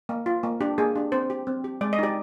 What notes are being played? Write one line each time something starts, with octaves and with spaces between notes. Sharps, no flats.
A#3
F4
A#3
D4 G4
A#3 G#4
D4 G4
C4 C5
G4
C4
G4
G#3 D5
D#5
D#4 G4 D5